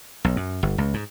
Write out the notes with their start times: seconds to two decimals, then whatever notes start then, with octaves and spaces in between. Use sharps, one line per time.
0.24 B1
0.36 F#2
0.63 G1
0.78 C#2
0.94 G#2